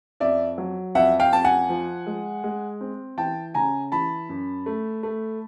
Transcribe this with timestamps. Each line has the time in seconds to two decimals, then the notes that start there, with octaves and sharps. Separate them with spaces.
0.20 F2 D5 E5
0.58 F#3
0.95 F2 E5 F#5
1.20 F5 G5
1.32 F2 A5
1.45 F#5 G#5
1.69 F3
2.06 G#3
2.44 G#3
2.81 C4
3.18 E3 G5 A5
3.54 C#3 G#5 A#5
3.92 E3 A5 B5
4.29 F#2
4.66 A3
5.03 A3